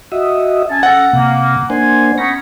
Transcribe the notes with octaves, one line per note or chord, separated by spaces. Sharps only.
F#4 D#5 E5
C#4 G#5 A5
C#4 A4 F#5 A#6
C3 A#3
A#3 D4 C5 G#5
B3 C#4 D#4 B5 C#6 A#6